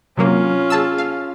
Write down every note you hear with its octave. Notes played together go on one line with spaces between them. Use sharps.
C3 F#3 A#3 C#4 F4
G#4 A5 E6
F5